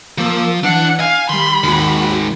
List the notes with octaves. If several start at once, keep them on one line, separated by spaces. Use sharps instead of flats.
F3 A#3 D6 E6
E3 D4 F#5 C#7
F5 G#5
D#3 G3 B5 C6
D#2 D#3 G#3 F#4